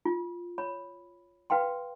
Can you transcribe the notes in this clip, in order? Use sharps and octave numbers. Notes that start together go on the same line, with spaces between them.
F4
C#5 B5
B4 F5 G5 C6